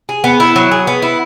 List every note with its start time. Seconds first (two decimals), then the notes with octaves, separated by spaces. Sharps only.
0.09 G#4
0.24 B3
0.40 E4
0.56 F#3
0.71 G#4
0.87 B3
1.02 E4